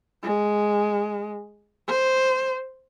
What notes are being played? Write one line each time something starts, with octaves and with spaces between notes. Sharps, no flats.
G#3
C5